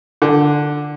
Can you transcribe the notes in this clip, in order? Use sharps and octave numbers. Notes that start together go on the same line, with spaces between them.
D3